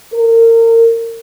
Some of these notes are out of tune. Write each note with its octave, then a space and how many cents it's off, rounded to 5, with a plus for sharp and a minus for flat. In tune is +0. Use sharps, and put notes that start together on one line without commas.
A#4 -30